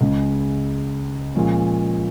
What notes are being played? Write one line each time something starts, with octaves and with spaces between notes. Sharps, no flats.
C#2 C#3 G#3
A#2 F3 G#3 C#4